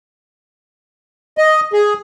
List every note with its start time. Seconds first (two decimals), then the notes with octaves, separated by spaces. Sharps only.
1.38 D#5
1.73 G#4